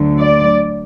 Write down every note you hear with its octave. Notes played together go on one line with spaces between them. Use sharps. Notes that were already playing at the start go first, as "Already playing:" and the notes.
Already playing: D2 D3 F#3
D5